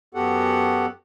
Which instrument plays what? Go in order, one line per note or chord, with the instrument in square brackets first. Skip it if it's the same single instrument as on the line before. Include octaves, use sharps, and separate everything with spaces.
[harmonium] F#2 B3 F#4 G4 A4 F#5